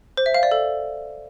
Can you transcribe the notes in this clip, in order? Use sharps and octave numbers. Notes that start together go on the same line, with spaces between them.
C5
E5
F5
D5
A4